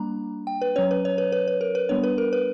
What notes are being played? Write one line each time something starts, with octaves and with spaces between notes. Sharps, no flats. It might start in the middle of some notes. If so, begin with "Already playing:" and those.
Already playing: G3 A#3 D4 A#5
G5
B4
F#3 C#4 C#5
B4
C#5
B4
B4
B4
A#4
B4
G3 B3 D4 C#5
B4
A#4
B4